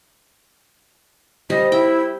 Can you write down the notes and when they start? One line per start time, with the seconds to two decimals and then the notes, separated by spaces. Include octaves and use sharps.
1.50 G3 C4 D#5
1.72 E4 G5